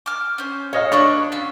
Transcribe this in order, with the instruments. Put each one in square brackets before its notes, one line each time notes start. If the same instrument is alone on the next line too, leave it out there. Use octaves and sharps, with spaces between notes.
[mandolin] D6 F6
C#4 C5
[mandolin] A4 [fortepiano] C#5 D#5 F5
[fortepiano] D4 [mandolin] B4 C#5 C#6
[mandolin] C#4 F4 E6